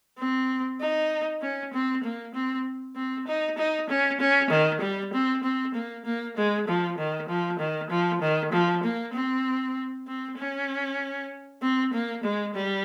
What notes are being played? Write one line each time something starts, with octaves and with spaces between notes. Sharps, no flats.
C4
D#4
C#4
C4
A#3
C4
C4
D#4
D#4
C#4
C#4
D#3
G3
C4
C4
A#3
A#3
G#3
F3
D#3
F3
D#3
F3
D#3
F3
A#3
C4
C4
C#4
C4
A#3
G#3
G3